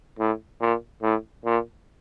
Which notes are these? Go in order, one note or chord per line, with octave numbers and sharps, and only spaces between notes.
A2
A#2
A2
A#2